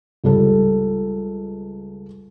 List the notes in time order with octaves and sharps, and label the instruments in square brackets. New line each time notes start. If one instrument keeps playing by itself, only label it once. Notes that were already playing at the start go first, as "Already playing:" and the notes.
[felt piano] C#2 G3 A4